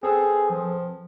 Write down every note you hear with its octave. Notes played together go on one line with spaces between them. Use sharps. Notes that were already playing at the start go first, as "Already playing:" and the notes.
C4 G#4 A4 B4
F3